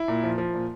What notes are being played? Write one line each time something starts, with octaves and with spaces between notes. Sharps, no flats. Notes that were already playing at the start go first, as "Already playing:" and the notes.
Already playing: E4
A#2
F3
F3
A#2